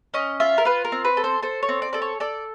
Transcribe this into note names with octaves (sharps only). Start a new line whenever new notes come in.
C#4 D#5
F4 E5
A#4
F4 B4
A#4
C4
B4
A4
C5
A4 C5
C#5
C4
D5
A4 D5
C#5
A4 D5